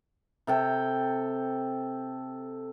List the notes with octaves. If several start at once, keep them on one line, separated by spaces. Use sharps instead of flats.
C3 A4 G5